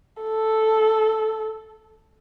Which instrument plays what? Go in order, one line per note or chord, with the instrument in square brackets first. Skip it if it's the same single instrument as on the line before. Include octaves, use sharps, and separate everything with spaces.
[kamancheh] A4